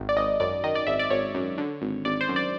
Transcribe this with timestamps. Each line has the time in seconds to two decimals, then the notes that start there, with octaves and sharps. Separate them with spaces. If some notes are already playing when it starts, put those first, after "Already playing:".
Already playing: G#1 D#3
0.09 D5
0.17 G#1 D#5
0.40 F#2 D5
0.64 D#3 D#5
0.75 D5
0.87 G#1 E5
0.99 D5
1.10 G#1 C#5
1.34 F#2
1.58 D3
1.82 G#1
2.05 G#1 D5
2.21 C5
2.28 F#2
2.36 D5